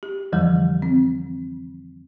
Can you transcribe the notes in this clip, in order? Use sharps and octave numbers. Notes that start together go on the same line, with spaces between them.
G4
F2 D3 E3 F3 G3
C4